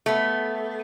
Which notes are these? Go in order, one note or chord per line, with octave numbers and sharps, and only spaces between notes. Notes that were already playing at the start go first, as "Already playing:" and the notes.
A3 B3